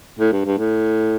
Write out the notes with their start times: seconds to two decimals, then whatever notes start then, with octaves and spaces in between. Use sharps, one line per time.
0.19 A2
0.32 G2
0.45 G2
0.58 A2